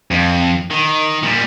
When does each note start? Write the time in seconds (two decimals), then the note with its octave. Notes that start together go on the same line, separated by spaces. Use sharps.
0.11 F2
0.71 D#3
1.23 A#2 G3